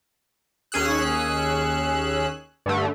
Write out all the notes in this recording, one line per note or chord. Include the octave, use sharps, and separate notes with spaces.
D#2 C#4 G#4 E6 F#6
G2 D3 A3